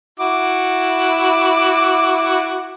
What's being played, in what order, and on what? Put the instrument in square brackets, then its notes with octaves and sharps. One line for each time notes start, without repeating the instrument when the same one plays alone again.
[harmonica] E4 F#4 D6